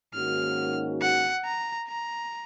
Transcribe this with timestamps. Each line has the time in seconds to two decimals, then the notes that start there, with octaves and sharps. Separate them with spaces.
0.14 G#2 D#3 A#3 C#4 F#4 F6
1.02 F#5
1.45 A#5
1.88 A#5